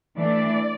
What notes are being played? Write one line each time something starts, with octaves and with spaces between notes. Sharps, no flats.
E3 A3 D4 D5